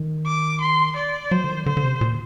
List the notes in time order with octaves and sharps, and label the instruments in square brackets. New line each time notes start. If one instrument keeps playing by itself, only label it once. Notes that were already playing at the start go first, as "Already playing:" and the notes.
Already playing: [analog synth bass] D#3
[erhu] D6
C6
D5
[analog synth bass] F#3 [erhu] C5
[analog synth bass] D3
D#3
[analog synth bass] D3 [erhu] C5
[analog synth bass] D3
C3
A#2